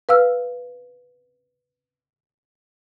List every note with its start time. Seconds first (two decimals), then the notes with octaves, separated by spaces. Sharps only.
0.09 B4 F5 E6 F6